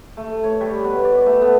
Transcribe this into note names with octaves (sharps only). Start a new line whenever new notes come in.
A3
C#5
G3
B2
D5
A3
B3